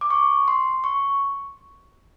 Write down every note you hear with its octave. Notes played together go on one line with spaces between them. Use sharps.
D6
C#6
C6
C#6